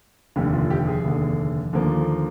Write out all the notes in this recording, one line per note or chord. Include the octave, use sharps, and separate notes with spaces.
F1 D#2 D3 G4
F4
G4
G#4
F1 D#2 D3
D#2 D3 F3 A#3